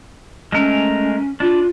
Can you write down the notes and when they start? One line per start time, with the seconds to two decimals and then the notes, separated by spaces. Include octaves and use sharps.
0.52 G#3 A3 C#4 A#4
1.40 D4 F4